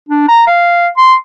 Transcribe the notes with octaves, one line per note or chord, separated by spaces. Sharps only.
D4
A#5
F5
C6